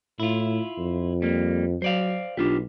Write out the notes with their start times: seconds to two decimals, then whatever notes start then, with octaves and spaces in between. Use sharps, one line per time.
0.20 A2 E4 F4
0.78 F2
1.22 G3 A#3
1.82 F#3 C5 D5 F5
2.37 B1 D4 F4 G4